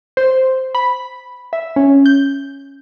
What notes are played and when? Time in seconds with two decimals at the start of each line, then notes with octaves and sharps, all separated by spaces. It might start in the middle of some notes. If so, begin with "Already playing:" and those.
0.17 C5
0.75 B5
1.53 E5
1.76 C#4
2.06 G6